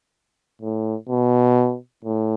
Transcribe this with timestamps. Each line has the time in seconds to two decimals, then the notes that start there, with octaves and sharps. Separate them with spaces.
0.62 A2
1.09 B2
2.04 A2